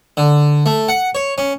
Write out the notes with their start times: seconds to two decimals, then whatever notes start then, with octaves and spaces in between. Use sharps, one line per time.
0.17 D3
0.66 A3
0.88 F#5
1.15 C#5
1.38 C#4